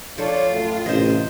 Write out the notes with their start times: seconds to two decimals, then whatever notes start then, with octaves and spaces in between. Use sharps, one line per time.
0.18 F3 D4 F4 A4 C#5
0.51 F#2 A2
0.86 A1 C3 C5 D#5